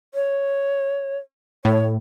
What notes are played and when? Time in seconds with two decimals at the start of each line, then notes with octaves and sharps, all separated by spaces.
0.14 C#5
1.65 A2 C#5